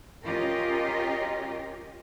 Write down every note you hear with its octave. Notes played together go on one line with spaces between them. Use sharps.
C#4 F4 G4 A#4 D#5